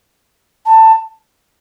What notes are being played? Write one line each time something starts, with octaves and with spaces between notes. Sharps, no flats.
A5